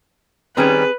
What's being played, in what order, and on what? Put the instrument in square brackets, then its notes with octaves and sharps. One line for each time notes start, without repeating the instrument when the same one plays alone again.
[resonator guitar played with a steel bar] D#3 G3 C#4 [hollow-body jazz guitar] C4 G#4 [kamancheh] B4